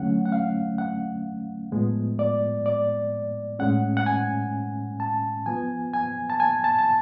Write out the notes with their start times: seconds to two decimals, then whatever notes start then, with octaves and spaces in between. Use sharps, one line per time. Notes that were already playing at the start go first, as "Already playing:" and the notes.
Already playing: D3 F#3 A3 C#4 F#5
0.25 F#5
0.32 F5
0.78 F#5
1.72 A2 F3 G#3 B3
2.19 D5
2.66 D5
3.59 A2 G#3 C#4 F#5
3.97 F#5
4.06 G#5
5.00 A5
5.46 F3 B3 G#5
5.94 G#5
6.30 A5
6.40 G#5
6.64 A5
6.78 A5